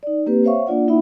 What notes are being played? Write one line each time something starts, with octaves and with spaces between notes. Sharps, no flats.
D#4 D5
A#3 C4 G4 B4
C5 C#5 E5 F5 C#6
A#3 D4 F4 D5 F#5
A#3 D#4 E4 E5 F#5 B5